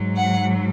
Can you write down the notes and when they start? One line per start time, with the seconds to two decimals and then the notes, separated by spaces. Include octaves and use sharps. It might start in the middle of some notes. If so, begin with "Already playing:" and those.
Already playing: G#2 F#3
0.16 F#5